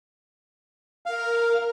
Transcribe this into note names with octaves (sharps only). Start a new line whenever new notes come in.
A#4 F5 F6